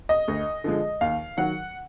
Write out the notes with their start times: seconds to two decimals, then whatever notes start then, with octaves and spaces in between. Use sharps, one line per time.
0.09 D#5
0.28 D2
0.64 D3 F3 G#3
1.01 D#2 F5
1.37 D#3 F#3 F#5